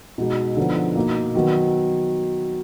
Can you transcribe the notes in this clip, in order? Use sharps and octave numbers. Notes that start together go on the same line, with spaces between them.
B2 G#3 D#4
D3 F3 B3 D#4
B2 A#3 D#4
D#3 F#3 B3